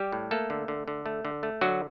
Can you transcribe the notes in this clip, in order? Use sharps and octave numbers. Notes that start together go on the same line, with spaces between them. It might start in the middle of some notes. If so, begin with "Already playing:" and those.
Already playing: G3 G4
A2
A3 A#3 A4
D3
D3
D3
A3
D3
A3
D3 F#3 F#4